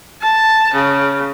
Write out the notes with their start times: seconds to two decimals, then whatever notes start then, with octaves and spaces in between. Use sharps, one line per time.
0.20 A5
0.73 C#3